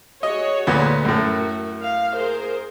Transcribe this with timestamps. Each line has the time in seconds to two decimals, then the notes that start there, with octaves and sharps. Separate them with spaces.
0.23 F#4 G#4 C#5 D#5
0.67 D2 A#2 B3
1.05 F#2 A2 F#4 A#4
1.81 F5
2.15 G#4 A#4 C5